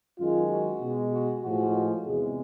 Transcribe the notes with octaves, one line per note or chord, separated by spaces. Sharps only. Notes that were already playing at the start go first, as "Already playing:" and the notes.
F#2 D#3 G#3 F4
F#4
B2 G#3
F#4
A2 F3 G#3 F#4
E2 C3 E3 G#3 G#4